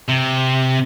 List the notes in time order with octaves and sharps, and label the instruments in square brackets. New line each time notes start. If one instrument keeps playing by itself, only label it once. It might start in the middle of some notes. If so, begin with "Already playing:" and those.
[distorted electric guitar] C3